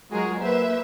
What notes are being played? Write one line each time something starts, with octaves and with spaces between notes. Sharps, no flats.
F#3 G#3 F4 F#4 G#4 A#4
A#3 B4 C5 E5